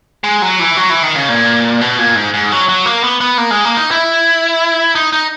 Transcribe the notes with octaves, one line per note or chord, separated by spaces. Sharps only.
G#3
F#3
E3
F#3
E3
D#3
C#3
A#2
B2
A#2
G#2
G#2
F#3
F#3
A#3
B3
B3
A#3
G#3
A#3
D#4
E4
D#4
D#4